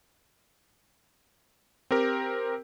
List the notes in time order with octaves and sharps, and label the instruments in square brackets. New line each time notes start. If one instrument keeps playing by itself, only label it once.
[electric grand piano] C4 G4 A#4